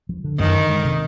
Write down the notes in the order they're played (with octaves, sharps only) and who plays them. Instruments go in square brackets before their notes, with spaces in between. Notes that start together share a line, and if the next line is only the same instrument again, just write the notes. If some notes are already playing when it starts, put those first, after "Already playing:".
[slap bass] F3
D3
[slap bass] F#2 [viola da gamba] D#3
[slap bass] D3
G#3
C3